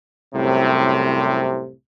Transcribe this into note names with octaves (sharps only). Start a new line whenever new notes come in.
C2 F#2 A2 C3